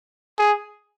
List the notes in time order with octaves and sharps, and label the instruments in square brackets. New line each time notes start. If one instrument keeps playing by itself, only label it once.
[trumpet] G#4